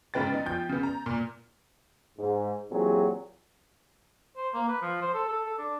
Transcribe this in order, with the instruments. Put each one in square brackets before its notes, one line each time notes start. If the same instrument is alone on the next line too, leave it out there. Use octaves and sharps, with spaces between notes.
[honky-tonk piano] G#2 C#3 B4 G5 A6
B3 D#4
F3 G5 G6
C#3 B3
A#5
A#2
[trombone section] G#2
A#2 E3 F#3 C4 G4 G#4
[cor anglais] C5
A#3
B4
F3
C5
A4
A4
A4
D4